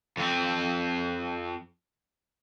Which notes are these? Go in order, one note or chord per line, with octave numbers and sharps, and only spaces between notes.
F2 C4